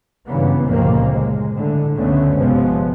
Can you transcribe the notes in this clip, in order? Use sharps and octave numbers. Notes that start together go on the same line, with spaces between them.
G2 C#3 E3 A#3 B3
G1 C#2 A#2 D#3 F3 A#3
G#3
A2 D3
C#2 F#2 D3 A3 B3 C#4
G1 C3 F3 G#3 B3